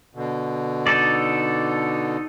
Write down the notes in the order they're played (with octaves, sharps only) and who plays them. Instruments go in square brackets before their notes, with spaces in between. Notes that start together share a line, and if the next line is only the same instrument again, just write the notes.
[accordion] B2 D3
[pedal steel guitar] D#4 A4 D5